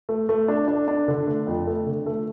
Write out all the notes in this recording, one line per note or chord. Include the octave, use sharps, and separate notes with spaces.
A3
A3
D4
D4
D4
D3
A3
F2
A3
D3
A3